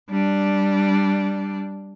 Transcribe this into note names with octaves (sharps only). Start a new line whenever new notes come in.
G3 D4